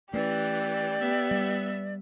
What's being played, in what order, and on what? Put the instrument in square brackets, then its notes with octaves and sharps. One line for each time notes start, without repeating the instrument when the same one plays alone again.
[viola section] E3 [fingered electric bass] A3 C#4 [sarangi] G4 [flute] D5
[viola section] B3 E5
[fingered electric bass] G3